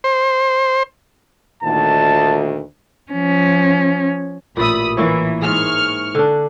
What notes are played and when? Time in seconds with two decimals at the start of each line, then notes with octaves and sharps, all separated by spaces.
0.04 C5
1.63 D2 A#2 D#3 A5
3.12 F3 C#4
4.57 A1 A#2 D5 E5 B5 D#6
4.97 E3 A#3 E4 C#5
5.42 G#2 G#4 C#6 F6
6.15 D3 D4